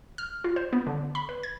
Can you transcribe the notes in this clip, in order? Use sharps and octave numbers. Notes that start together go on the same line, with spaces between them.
F6
F4
C5
B3
D3
B5
B4
G#6